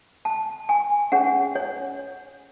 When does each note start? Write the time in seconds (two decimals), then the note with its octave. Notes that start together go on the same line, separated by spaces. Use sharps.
0.25 A5
0.69 G#5
1.12 C#4 G#4 C#5 F#5
1.56 C#5